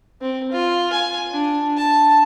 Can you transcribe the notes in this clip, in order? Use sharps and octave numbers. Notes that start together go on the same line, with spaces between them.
C4
F4
G#5
D4
A5